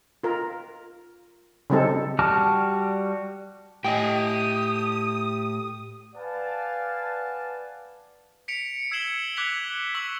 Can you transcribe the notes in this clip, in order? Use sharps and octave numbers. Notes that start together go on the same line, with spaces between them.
F4 A#4
C#3 F#3 G3 C4 D#4 A4
G3 F#4 A5 D6 F6
A2 G4 D#5 G5 G#5 D#6
B4 D5 F5 F#5 G#5 A5
B6 C#7 D7 F7
E6 G#6 C7 E7 F#7 G7
D6 F#6 G#6 B6 F7 G7
C#6 E6 B6 F#7